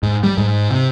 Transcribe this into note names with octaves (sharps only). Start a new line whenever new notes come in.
G#2
G3
G#2
C3